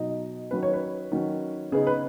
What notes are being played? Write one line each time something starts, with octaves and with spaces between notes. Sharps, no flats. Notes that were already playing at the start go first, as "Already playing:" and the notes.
Already playing: B2 F#3 D#4 D#5
D#3 F#3 C#4 B4
C#5
B4
D#3 F#3 C#4
C#3 B3 D#4 G#4
B4